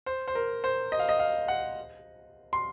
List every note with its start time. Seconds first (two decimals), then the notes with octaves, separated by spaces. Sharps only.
0.06 C5
0.28 C5
0.35 A#4
0.64 C5
0.92 D#5
0.99 F5
1.09 D#5
1.19 F5
1.48 F#5
2.53 C6